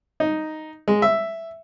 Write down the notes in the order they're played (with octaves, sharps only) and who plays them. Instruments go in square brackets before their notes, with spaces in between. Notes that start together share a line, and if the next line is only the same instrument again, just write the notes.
[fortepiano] D#4
G#3
E5